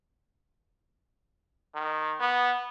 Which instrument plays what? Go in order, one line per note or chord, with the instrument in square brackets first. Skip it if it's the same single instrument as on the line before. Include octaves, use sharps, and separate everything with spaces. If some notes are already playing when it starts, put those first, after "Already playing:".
[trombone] D#3
B3